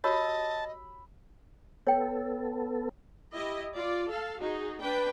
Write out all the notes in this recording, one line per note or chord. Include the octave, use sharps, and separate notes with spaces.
F#4 G4 C#5 D#5 A5 B5 E6
B3 A4 C#5 G5
E4 G4 D#5
F4 D5
A4 F5
D#4 F#4 G#4
D4 B4 G5